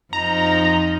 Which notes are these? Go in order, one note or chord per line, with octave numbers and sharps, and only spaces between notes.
F2 F3 D#4 A#5